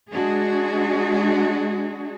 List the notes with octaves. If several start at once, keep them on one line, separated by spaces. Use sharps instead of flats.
G#3 D4 F#4 G#4